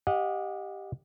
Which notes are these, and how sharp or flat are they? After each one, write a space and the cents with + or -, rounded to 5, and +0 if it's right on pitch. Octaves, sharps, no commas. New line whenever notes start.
G4 +0 D#5 +0 F#5 -40